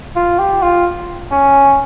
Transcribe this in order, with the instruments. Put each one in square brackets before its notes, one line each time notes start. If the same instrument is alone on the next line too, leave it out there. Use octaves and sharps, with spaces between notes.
[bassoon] F4
G4
F4
C#4